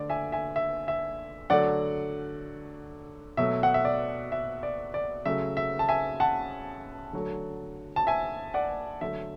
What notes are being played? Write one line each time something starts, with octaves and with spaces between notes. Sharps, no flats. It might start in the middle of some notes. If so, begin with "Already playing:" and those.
Already playing: D3 A3 D5
E5 G#5
E5 G#5
E5
E5
D3 F#3 A3 D5 F#5
B2 F#3 A3 E5
F#5
E5
D5
E5
D5
D5
C#3 F#3 A3 E5
E5
A5
E5 G#5
F#5 A5
D3 F#3 A3
A5
E5 G#5
D5 F#5
D3 F#3 A3 E5